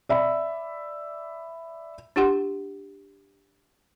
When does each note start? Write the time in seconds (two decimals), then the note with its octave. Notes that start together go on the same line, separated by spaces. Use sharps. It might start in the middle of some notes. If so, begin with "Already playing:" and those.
0.09 D5 E5 B5
2.16 D4 F4 G4 F#5 C6